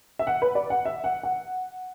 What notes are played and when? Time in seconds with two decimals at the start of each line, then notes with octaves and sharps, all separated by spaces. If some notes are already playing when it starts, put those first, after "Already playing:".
0.19 E5
0.27 F#5
0.42 B4
0.55 D5
0.70 F#5
0.85 E5
1.04 F#5
1.23 F#5